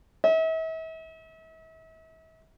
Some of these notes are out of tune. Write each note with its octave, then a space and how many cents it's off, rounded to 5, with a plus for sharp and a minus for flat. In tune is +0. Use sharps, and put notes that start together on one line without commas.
E5 -40